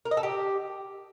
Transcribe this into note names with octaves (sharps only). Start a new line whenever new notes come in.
A#4
D#5
A4
G4